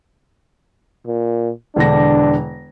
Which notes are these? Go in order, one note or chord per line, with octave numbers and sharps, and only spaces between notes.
A#2
E1 D3 D4 A#6